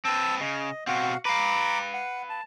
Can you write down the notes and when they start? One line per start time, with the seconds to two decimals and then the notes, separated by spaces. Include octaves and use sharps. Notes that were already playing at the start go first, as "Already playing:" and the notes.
0.05 C4 B4 A5 E6
0.40 C#3 D#5
0.87 B2 C4 F#4 F5 F#5
1.25 B4 F5 A#5 B5 D6
1.94 F#5
2.29 A5